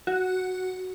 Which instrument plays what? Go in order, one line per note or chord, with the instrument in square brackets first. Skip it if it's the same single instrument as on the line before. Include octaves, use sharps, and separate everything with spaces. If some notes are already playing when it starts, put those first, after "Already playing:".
[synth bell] F#4